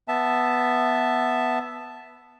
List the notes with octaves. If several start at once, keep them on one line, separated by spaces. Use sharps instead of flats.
B3 E5 A5